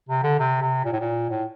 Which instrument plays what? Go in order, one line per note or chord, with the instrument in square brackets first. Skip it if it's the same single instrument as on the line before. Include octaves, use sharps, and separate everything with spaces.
[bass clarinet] C3
D3
C3
C3
A#2
A2
A#2
A2